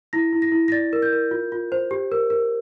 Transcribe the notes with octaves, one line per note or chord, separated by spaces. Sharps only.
E4 A#6
E4
A#6
E4
A#6
D5 A6
A#4
G6
A#4
F4
F4
C5
G4
A#4
A#4